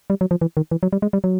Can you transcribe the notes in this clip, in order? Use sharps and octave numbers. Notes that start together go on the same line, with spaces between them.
G3
F#3
F3
E3
D#3
E3
F#3
G3
G#3
G3
F#3